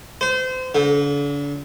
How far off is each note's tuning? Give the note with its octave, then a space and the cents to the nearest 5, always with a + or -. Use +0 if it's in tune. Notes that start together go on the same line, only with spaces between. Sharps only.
C5 -30
D3 -40